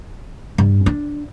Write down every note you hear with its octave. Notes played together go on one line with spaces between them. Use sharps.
G2
D4